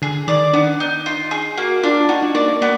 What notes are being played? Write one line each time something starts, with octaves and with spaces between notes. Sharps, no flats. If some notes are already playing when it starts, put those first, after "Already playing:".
D3 G#4
D#3 D5
B3 D4
D#4
F4
G#4
A#3 F#4
D4 F4
D#4 F#4
D4
A#3 D5
A#3
A#3 B3